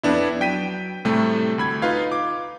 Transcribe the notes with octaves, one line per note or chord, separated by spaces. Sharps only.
F2 B3 D4 E4
F#3 G5 B6 D#7
A2 C3 G3 A3
D2 B5 G#6
D#4 F4 B4 F5 G#6
D6